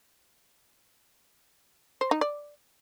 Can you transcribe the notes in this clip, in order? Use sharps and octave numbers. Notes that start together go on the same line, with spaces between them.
C5
D#4
D5